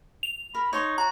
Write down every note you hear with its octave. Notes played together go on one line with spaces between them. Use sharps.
F7
A#4 B5
D#4 C#5 C6 C#6
F#4 A#5